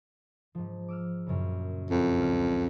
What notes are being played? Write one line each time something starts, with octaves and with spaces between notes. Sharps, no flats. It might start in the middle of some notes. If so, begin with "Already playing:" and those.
G#2 F3
D6 E6 F6
F#2 A#2 C#3
F2
C#2 D5 F6